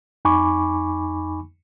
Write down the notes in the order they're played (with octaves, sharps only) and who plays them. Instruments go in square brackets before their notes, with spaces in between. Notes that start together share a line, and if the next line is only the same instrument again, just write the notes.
[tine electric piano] F2 D#4 G#5 B5 C#6 D6